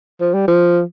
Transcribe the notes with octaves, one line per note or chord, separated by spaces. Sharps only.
F3
G3
F3